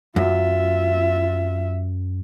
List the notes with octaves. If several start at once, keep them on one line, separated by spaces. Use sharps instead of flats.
F#2 F4 E5